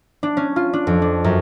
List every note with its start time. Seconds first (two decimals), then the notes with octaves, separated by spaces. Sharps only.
0.23 D4
0.37 C#4
0.56 F4
0.73 D4
0.87 F2
1.02 D4
1.24 F#2